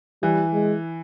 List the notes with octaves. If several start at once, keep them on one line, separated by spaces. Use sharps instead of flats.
E3 G3
G#3